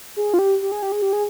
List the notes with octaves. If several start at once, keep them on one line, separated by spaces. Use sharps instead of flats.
G#4
F4
G4
G4
G#4
G4
G#4
G4
G#4